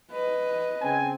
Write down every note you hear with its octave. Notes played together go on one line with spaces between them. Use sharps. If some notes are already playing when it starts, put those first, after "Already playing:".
B4 D#5
C#3 C4 G#5